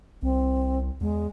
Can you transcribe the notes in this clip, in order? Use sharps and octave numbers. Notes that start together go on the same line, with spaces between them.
C2 C4
E2 G#3